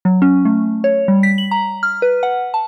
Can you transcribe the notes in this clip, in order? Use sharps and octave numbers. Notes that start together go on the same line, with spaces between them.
F#3
C#4
A3
C#5
G3
B6
F#7
A#5
F6
B4
F#5
A5